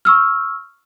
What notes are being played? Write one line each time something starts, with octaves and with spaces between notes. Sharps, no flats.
C#6 E6 F6